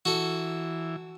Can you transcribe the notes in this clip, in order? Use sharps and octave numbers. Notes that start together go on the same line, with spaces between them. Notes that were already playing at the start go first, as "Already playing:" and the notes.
E3 F#4 A4